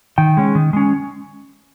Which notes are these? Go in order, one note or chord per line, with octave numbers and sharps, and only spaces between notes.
D#3 G5
G#3 C#4
D#3
G#3 C#4